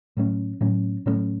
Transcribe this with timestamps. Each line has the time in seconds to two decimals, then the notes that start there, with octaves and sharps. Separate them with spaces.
0.17 A2 F#3 A3 C#4
0.61 A2 F#3 A3 C#4
1.06 A2 F#3 A3 C#4